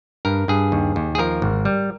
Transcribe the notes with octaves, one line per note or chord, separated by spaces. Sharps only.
G2 A#4
G2 G#4
D#2
D#2
G#4
F3 A#4
G#1
G3